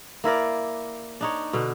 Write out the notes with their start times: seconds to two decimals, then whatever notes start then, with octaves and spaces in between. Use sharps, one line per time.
0.24 A#3 E4 A#4 D5
1.21 D4 D#4 C#5
1.53 B2 D3